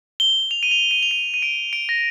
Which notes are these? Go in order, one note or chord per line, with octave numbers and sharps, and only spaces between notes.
G7
F7
D#7
F7
D#7
F7
D#7
D#7
D7
D7
A#6